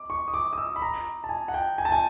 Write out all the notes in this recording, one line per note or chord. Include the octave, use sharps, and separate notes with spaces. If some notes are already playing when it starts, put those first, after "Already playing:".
Already playing: D6
C#6
D#6
D6
D#6
E6
B5
A#5
A5
G#5
F#5
G5
G#5
A5
G#5